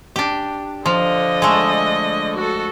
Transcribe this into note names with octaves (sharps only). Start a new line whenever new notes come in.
D4 G4
D3 F3 D#5
G#3 A3
F#4 A4